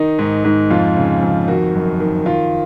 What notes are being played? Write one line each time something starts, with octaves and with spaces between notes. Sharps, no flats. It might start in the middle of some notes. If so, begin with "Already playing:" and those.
Already playing: D#3 D#4
G#2
G#2
F2 F4
C#3
F2
D#3 F#4
F#2
D#3
D#3 F4